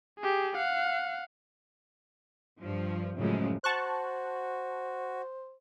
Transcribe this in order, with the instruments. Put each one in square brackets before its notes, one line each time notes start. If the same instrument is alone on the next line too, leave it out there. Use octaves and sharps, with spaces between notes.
[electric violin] G4 G#4
F5 F#5
[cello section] G2 F3
F#2 A2 C#3 F3 G#3
[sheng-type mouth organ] F#4 [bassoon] C5 [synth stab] A5 C#6 F#6